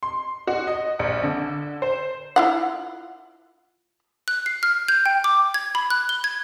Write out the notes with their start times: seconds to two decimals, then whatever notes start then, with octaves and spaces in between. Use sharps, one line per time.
0.03 C6
0.47 F#4
0.67 D#5
0.99 A#1
1.23 D3
1.82 C5
2.36 E4 F4 F#5
4.28 F#6
4.46 C7
4.63 F6
4.88 G6
5.06 G5
5.24 D6
5.54 G#6
5.75 B5
5.90 F#6
6.09 G7
6.24 G#6